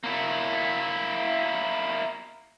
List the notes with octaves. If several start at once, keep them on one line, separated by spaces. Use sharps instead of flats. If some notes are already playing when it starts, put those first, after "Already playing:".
A#3 E4